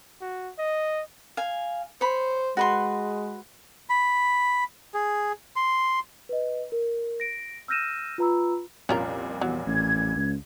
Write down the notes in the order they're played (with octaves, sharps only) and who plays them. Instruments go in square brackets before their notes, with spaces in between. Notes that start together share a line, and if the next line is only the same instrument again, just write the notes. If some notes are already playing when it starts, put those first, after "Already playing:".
[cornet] F#4
D#5
[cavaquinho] F5 G#5
[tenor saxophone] C5 [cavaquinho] C#5 B5
[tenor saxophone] G#3 [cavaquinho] F#4 B4 C6
[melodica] B5
G#4
C6
[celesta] B4 D#5
A#4
A#6 D7
E6 F6 G6 A#6 D#7 E7
F4 B4 A#5 B5 E6
[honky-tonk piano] C2 F2 A#2 [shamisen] C#4 F4 A#4
[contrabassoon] E2 [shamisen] F#3
[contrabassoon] A1 [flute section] G#6
[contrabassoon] C#2